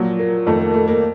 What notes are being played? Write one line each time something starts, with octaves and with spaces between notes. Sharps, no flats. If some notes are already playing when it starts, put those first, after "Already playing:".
Already playing: A#2 F3 F#3
A#3
F2 D#3 A3
A#3
A3
A#3